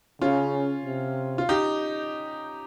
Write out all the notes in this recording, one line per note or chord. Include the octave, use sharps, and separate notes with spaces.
C#3 C#4 F4
C3
F4
D#4 G4